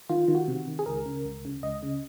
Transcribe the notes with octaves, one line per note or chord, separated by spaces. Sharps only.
D#3 F4
D#3
F#4
C3
D#3
G#4
C#2 A#4
C#3
C#2
C#3
C#2 D#5
C#3